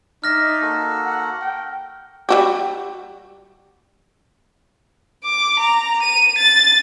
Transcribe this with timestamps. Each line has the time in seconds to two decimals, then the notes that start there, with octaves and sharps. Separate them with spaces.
0.24 D#4 D5 E5 F6 A#6
0.62 A#3 F#4 A4
1.05 F#5
1.41 G5
2.29 G3 F#4 G4
5.25 D6
5.60 A#5
6.03 D#7
6.38 A6